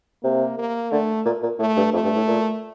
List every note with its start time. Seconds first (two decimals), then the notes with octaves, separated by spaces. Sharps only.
0.23 C3 A#3
0.58 A#3
0.91 D3 A3
1.26 A#2
1.43 A#2
1.59 A2 A3
1.77 G2
1.93 F2 A3
2.04 G2
2.16 A2
2.27 A#2